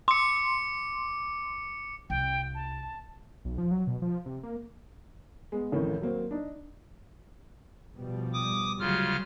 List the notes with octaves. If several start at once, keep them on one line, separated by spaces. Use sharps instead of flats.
C6 D6 C#7
C2 G5
A5
B1
F3
F#3
B2
F3
C3
A#3
G#3 B3
A1 F2 A2 D#3
F#3 A#3 C4
D4 D#4
B2 F3 G3
D6 D#6
D2 C#3 F#3 G3 F4 F6